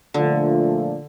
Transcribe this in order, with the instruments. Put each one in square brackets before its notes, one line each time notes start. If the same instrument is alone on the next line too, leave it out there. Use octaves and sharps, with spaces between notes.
[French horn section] A#2 F3 A3 D4 F4 [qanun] D3